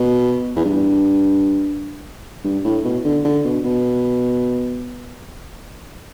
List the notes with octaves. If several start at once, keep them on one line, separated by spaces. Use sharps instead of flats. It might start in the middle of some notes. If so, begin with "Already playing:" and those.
Already playing: B2
E2
G2
G2
A2
B2
D3
D3
B2
B2